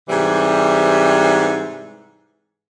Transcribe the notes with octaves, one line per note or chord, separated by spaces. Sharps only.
G#2 C3 E3 G3